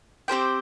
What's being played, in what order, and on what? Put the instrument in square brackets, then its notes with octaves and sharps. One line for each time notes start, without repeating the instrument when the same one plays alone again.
[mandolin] C4 G4 C5 G5